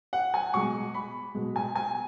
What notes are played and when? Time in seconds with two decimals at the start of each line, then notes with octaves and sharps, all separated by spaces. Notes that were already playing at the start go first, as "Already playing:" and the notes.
0.13 F#5
0.34 G#5
0.54 B2 G#3 C#6
0.94 B5
1.35 B2 G#3
1.56 G#5
1.75 G#5